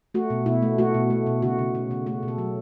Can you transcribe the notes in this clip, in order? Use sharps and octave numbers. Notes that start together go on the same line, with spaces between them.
A3 F#4
B2
B2 E4
A3
A3 F#4
B2
A3
B2
C#3 F#4
C#3
C#3
C#3
A3 F#4
B2
A4
F#3